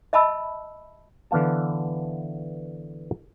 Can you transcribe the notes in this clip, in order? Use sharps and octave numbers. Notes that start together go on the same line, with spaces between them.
D#5 E5 A5 B5 E6
D3 E3 B3 F5 A5